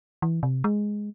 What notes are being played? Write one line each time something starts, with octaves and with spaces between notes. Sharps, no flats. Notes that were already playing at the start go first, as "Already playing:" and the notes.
E3
C3
G#3